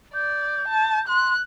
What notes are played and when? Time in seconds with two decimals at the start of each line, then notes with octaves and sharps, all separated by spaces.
0.14 D5 G6
0.68 A5
1.08 C6 F#6